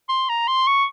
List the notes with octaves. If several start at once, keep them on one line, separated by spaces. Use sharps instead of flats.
C6
A#5
C6
C#6